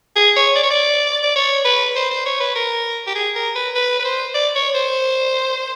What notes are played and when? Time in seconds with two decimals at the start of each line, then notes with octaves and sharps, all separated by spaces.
0.16 G#4
0.36 C#5
0.56 D5
0.63 C#5
0.70 D5
1.23 D5
1.36 C#5
1.65 B4
1.96 C5
2.11 C5
2.26 C#5
2.40 B4
2.55 A#4
3.07 G4
3.15 G#4
3.36 A#4
3.55 B4
3.75 B4
4.00 B4
4.05 C5
4.34 D5
4.55 C#5
4.75 C5